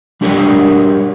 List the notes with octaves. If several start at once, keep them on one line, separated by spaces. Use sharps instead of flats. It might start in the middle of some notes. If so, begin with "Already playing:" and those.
G3 D4 G4 A#4 C#5